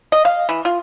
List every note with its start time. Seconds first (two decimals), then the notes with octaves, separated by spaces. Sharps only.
0.12 D#5
0.25 F5
0.49 E3
0.65 F4